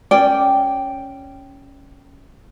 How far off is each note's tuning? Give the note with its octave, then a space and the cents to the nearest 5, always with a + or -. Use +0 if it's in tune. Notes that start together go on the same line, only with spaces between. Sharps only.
C#4 +0 D5 +0 G5 -5